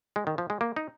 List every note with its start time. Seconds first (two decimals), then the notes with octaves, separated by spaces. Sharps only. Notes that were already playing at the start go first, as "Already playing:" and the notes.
0.16 G#3
0.27 D#3
0.38 F3
0.50 G#3
0.61 A#3
0.76 D#4